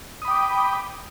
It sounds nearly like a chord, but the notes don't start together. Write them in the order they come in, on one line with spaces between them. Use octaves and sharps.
D#6 B5 G5 D6